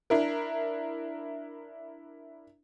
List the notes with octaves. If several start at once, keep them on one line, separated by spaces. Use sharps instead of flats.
D4 E4 A#4